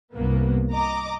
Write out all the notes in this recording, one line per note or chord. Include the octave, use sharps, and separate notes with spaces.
C2 G2 A#3 B3
D#5 A#5 D6